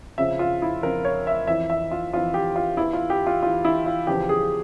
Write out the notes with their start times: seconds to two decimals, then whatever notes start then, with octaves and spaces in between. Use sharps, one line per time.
0.18 F2 C#3 F3 E5
0.39 F4
0.62 E4
0.83 F2 C#3 F3 A#4
1.05 C#5
1.27 E5
1.47 F2 E3 E5
1.70 E5
1.91 F4
2.13 F2 E3 F4
2.34 G4
2.56 F4
2.77 E2 E3 E4
2.93 F4
3.10 G4
3.27 F4
3.43 E2 E3 F4
3.65 E4
3.86 F4
4.07 E2 C#3 F3 G4
4.29 G#4